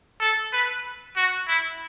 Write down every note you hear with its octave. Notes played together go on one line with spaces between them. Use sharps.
A4
B4
F#4
E4